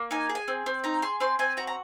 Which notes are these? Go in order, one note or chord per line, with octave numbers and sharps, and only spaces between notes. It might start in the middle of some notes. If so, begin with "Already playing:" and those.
Already playing: A#3
D#4 G#5
G#4
G#5
C4
C4
D#4 A#5
G#4 C6
C4 C6
C4 G#5
F#4 A#5
A#5